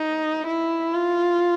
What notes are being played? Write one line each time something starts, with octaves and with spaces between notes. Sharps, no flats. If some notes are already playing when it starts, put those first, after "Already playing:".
Already playing: D#4
E4
F4